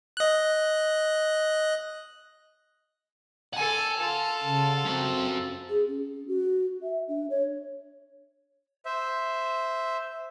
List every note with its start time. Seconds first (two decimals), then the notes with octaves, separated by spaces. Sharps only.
0.17 D#5 F#6
3.54 A4 F#5 G#5 A5
3.98 F4 A4
4.43 C#3
4.86 C4 C#4 F#4
5.69 G#4
5.87 C#4
6.28 F#4
6.83 E5
7.08 D4
7.30 C#5
8.85 C5 E5